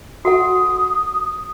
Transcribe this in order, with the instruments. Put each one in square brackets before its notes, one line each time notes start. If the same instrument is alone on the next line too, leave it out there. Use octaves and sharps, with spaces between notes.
[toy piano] F#4 A4 F#5 [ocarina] D#6